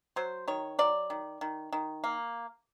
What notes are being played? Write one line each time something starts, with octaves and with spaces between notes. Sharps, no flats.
F#3 C5
D#3 C#5
F#3 D5
D#3
D#3
D#3
A#3